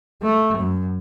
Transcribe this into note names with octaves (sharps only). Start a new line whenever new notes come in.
A3
F#2